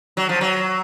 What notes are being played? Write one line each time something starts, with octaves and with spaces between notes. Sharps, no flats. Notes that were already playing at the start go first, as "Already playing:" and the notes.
F#3
F3
F#3